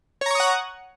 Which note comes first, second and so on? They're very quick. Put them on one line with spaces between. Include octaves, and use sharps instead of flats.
C#5 A#5 C#6 D#6 F#5